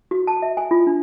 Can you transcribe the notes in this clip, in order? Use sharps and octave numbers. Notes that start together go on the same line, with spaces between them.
F#4
A5
E5
G#5
F4
D4